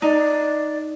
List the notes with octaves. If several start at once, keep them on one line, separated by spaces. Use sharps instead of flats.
D#4 D5